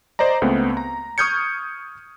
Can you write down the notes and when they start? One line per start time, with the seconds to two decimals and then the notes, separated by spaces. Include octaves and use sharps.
0.19 C5 D5 D#5 A#5
0.42 C#2 A3 B3 C4
0.77 A#5
1.18 C#6 D#6 F6 G6 G#6 C#7